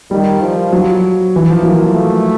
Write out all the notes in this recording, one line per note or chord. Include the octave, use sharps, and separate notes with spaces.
D#3 G3
F3
F#3
E3
F3
F#3 A#3
A3